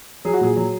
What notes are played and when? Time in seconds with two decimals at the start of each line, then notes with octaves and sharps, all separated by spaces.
0.25 F#3 G#4
0.34 F#4
0.41 A#2 G#4
0.56 F#3